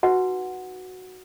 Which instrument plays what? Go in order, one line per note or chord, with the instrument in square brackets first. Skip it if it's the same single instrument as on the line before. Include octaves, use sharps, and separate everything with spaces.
[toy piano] D#4 F#4 B4 F#5